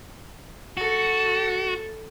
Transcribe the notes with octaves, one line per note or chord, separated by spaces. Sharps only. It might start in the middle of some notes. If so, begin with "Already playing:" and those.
F#4 A4